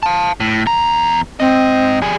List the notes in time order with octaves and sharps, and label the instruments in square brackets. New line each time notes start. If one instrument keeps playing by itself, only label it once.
[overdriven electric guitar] F5 A5
A2
E2 A#5
[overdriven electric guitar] G#2 D#5 [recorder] C4
[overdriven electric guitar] G3 G#4